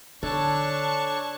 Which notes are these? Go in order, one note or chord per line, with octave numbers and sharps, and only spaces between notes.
D3 D4 A4 C#5 A5 C#6 F#6